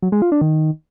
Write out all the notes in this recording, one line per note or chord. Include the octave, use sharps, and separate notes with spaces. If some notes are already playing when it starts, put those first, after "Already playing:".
F#3
G#3
F4
D4
D#3